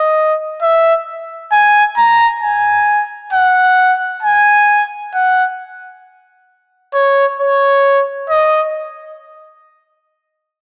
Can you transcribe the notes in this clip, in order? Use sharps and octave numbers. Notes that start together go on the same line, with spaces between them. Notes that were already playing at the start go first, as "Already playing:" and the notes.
Already playing: D#5
E5
G#5
A#5
G#5
F#5
G#5
F#5
C#5
C#5
D#5